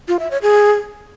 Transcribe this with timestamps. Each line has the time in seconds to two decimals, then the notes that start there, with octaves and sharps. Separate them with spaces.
0.08 F4
0.19 E5
0.31 C#5
0.42 G#4